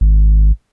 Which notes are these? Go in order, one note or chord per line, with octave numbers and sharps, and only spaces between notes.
G#1